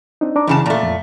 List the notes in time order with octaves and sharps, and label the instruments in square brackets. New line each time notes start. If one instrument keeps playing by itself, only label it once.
[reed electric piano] C4 D4 D#4
D4 A#5 D6
[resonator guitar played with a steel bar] F#2 C#3 A5 [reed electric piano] E3
[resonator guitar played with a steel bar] A#2 A3
[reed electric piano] F2